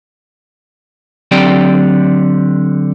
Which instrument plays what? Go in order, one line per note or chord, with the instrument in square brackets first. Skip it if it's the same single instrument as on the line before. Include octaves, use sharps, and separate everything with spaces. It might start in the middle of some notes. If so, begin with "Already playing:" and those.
[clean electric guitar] D3 F#3 C4 G4 D5 G5